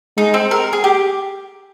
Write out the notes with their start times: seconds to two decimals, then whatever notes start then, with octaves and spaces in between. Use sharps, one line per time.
0.17 G#3 D#4
0.34 C4
0.51 A#4
0.73 G#4
0.84 G4